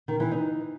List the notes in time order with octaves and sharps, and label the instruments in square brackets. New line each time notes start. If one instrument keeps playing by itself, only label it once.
[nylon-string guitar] D#3
E3
D#4